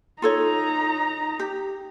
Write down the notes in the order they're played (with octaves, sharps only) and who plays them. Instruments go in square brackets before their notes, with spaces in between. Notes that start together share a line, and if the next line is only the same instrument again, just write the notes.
[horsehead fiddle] D#4 A#5 [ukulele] F4 A4 C#5
[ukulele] G4